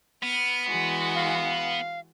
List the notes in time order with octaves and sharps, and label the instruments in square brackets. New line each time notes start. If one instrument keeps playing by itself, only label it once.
[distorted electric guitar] B3 [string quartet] F6
[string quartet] E3 G#3 F#4
[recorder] F5